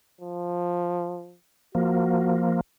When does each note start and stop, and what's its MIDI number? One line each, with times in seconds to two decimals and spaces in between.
0.21 1.36 53
1.75 2.61 53
1.75 2.61 58
1.75 2.39 66